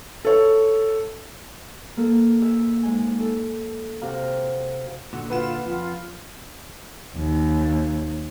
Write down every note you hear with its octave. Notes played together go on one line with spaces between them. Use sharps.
A4 C#5
A#3 A4 A#4
G#4 E5
G#2 G#5
A4
C3 F#4 F5 A#5
A#2 D3 F#4
F4 B4 F#5 E7
F2 F4
D#2